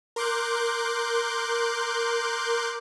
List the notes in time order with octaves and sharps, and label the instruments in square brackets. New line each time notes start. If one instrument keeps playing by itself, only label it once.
[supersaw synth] A#4 C6 D6 F#6 G6